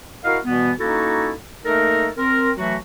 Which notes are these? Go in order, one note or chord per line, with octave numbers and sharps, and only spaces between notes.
E4 F#4 A#4 D#5 F5
B2 E3 G3 B3
A#3 C#4 D#4 E4 F#4 A4
A3 A#3 D#4 A4 A#4
C4 A#4
E3 F#3 A3 F#4